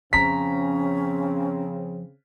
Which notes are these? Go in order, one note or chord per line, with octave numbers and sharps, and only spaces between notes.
F2 C#3 F3 C4 C#4 A#5 B6